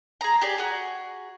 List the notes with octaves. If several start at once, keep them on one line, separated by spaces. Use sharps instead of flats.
G#4 A#5
G4 G#4 D5
F#4 G#4